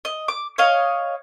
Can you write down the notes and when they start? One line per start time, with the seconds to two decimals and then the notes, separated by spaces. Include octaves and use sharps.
0.05 D#5
0.28 D6
0.58 C#5 D#5 F5